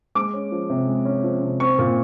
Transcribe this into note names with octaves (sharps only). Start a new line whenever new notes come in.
G#3 D6
C#4
F3
C3
G#3
C#4
F3
C3
C4 C#6
A#2